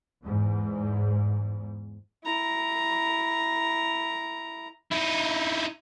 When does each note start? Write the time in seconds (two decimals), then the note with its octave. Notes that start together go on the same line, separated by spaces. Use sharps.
0.22 E2 G#2
2.24 E4 A#5
4.91 D#4 E4